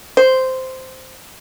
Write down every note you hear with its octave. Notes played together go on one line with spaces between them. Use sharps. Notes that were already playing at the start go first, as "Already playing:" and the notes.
C5